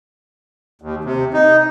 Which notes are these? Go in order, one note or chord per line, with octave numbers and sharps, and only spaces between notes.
D#2
C3
D#4